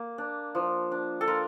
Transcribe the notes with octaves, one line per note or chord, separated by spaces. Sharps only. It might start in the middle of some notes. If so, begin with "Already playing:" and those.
Already playing: A#3
D4
F3
D4
A4
F4 A#4